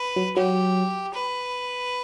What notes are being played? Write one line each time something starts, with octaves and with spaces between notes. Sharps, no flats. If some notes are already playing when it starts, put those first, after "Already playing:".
Already playing: B4
F#3
F#3 G4
B4